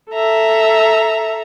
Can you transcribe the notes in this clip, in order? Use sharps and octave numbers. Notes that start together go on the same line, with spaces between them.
A4 E5 A#5